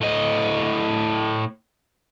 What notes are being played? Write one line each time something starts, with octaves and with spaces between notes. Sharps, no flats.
A2 D#5